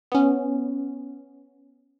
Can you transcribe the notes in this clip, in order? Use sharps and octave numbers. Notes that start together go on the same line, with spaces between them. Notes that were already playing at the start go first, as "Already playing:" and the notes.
B3 C#4